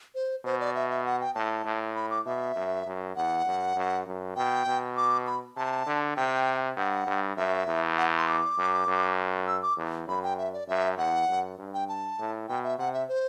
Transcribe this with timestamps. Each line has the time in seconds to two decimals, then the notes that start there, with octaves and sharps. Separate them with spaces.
0.15 C5
0.45 B2 C5
0.60 D5
0.75 E5
0.90 E5
1.06 F#5
1.21 G5
1.35 A2 A5
1.65 A2
1.96 B5
2.11 D6
2.26 B2 E5
2.56 F#2
2.86 F#2
3.16 E2 F#5
3.46 F#2
3.76 F#2
4.06 F#2
4.36 B2 G5
4.66 B2
4.97 D6
5.27 B5
5.56 C3 A5
5.86 D3
6.17 C3 G5
6.76 G2 F#5
7.07 G2
7.37 F#2 E5
7.67 E2
7.97 F#5
8.17 C6
8.28 D6
8.58 F#2
8.87 F#2
9.47 E6
9.63 D6
9.77 E2
10.08 F#2 B5
10.23 G5
10.38 E5
10.54 D5
10.68 F#2 E5
10.98 E2 F#5
11.29 F#2
11.58 G2
11.74 G5
11.89 A5
12.19 A2
12.48 B2 G5
12.64 E5
12.78 C3 F#5
12.93 E5
13.09 C5